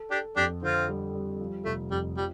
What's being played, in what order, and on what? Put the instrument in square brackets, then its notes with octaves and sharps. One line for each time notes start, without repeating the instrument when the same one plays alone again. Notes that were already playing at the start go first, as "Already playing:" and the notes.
Already playing: [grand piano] A4
[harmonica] D4 G4 [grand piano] A4
[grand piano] F2 [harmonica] D4 G4
[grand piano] D3 [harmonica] C4 F4
[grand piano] G3
G3
F3
[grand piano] F1 [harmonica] A3
[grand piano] F2 [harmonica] G3
[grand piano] F3 [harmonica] G3